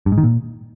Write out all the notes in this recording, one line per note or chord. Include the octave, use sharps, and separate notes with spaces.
G2
G#2
D#3
A#2